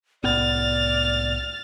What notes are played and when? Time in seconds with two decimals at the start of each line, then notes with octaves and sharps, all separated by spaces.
0.24 C2 A2 B3 D5 F6 A6